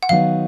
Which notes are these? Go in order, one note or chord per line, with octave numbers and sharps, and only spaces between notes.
F#5
D#3 F#3 B3 D#4 F5